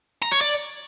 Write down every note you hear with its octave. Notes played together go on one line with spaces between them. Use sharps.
A#5
C#5
D5